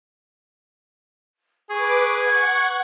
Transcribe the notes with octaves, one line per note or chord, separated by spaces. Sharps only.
G#4 B4 C#6 D6
F#5 C#6 G#6